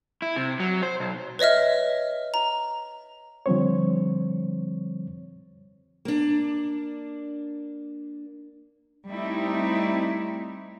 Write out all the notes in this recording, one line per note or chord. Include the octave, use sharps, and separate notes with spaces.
E4
C3
F#3
C5
B1
B4 C#5 D#5 E5 F6
A#5
D3 F3 G3 C4 C5 C#5
A#3 D4
G3 A3 C4 D#4 E4